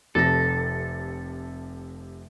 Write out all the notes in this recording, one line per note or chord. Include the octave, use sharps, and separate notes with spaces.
F1 C3 A4 A#6